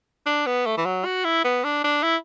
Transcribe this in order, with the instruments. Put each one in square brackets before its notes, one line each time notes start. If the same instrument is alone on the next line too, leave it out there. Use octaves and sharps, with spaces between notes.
[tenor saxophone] D4
B3
A3
E3
F#3
F#4
E4
B3
D4
D4
E4